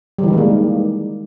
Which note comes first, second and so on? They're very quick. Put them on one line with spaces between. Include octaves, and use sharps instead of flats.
G3 E3 D#3 G#3 A#3